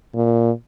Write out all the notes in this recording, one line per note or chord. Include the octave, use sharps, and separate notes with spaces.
A#2